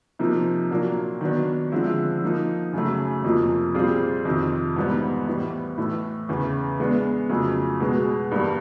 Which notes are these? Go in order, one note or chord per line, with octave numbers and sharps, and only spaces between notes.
C3 F3 A#3 D#4
A#2 F#3 A#3 D4
D#3 F#3 B3 D4
D3 F3 G#3 C4 E4
F3 A#3 D#4
F#2 C#3 F#3 A3
F2 C3 F3 A#3
A#2 G3 C4 F4 G#4
F2 C3 D#3
G#2 E3 G3 B3
A2 E3 G3 B3
A2 E3 A3
E2 C#3 E3
E3 G#3 B3 D4
F2 C#3 F#3 A3
B2 G#3 B3
G2 E3 G3 A#3